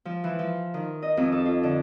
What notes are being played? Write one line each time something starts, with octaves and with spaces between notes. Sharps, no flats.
F3
E3
F3
D#3
D#5
F2
A4
F4
D3